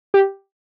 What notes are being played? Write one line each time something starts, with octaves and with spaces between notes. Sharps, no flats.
G4